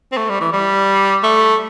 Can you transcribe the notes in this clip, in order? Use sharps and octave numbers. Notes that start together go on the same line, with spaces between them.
C4
A3
G3
E3
G3
A3